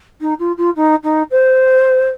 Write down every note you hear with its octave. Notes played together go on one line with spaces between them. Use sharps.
D#4
F4
F4
D#4
D#4
C5